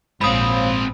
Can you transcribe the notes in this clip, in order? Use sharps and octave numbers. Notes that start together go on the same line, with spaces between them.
A#1 G#2 C4 C5 C#5 F5 B5 D#6